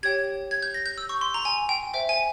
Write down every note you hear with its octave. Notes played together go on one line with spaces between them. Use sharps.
G4 C#5 G5 G#6
G#6
G6
A#6
G6
E6
C#6
C6
A#5
G#5
G5
C5 E5 G5
G#5